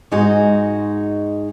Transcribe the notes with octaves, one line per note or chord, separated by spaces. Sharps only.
G#2 G#3 D#4 F#4